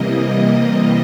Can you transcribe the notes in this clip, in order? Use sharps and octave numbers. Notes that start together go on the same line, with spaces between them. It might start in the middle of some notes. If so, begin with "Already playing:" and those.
Already playing: C3 E3 G3 A#3 D#5